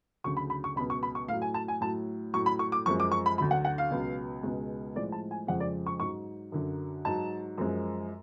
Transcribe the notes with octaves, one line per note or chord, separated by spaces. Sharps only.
D2 C#3 F#3 C#6
B5
B5
C#6
C#2 B2 F#3 B5
C#6
B5
C#6
A2 F#3 F5
G#5
A5
G#5
A2 F#3 A5
A2 F#3 C#6
B5
C#6
D6
F#2 F3 G#3 C#6
D6
C#6
B5
D2 D3 F#3 B5
F#5
F#5
F5
C#2 B2 F#3
C#2 B2 G#3
A2 F3 G#3 D5
A5
G#5
F2 C#3 F3 G#3 F#5
D5
C#6
G#2 F#3 C#6
F#2 D3 F#3
G#2 F#3 A5
F#2 F3 G#3